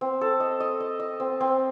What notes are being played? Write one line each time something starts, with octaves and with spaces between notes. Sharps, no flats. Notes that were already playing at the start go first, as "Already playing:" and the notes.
C4
A4
D#5
D#5
D#5
D#5
C4
C4